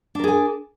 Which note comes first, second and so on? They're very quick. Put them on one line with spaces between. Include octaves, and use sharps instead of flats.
D4 A#4 G#4 G#5